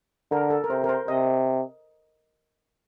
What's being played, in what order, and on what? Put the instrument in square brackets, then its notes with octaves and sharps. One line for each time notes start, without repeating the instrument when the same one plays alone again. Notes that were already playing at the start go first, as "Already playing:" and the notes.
[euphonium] D3 [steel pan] A#4
[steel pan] A4
A#4
[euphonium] C3 [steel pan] C5
[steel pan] A#4
C5
[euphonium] C3 [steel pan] D#5